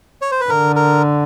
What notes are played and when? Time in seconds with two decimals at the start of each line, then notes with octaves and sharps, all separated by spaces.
0.21 C#5
0.31 C5
0.41 B4
0.50 D3 A#4
0.76 A#4